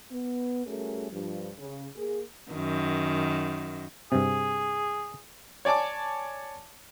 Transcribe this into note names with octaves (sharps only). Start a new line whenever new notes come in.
B3
G3 A3 C#4 F#4 G#4 A#4
G2 F3
C#3
A#3 G#4
F#2 D#3
G2 C3 G#4
C#5 D5 G#5 A5 D6